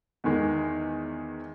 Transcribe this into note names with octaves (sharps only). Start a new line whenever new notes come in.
E2 D#3 G#3